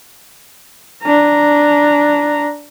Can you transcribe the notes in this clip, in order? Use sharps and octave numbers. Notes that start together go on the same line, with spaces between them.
D4 A#5